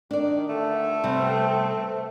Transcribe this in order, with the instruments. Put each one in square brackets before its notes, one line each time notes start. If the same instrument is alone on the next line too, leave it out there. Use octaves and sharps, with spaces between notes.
[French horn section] D#3 [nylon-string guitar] D4 D5
[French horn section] G2 A#2 D3 [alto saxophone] A3
[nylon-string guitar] C3 G3 [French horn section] B3 C4